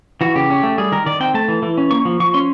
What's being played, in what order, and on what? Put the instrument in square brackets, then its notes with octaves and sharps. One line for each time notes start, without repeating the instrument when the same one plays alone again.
[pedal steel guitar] E3 F#4
C#3 G4
C#4
A3
G3 G#4
D#3 A#4
D#3 D5
C4 G5
A3 A5
E3
E3
C#4
A#3 C#6
F3
F3 C#6
C#4 C6